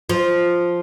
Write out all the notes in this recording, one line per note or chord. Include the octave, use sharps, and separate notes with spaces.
F3